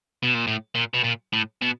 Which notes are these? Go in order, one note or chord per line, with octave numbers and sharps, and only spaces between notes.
B2
A#2
A2
A#2
B2
A#2
A2
B2